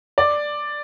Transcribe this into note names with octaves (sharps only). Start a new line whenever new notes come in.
D5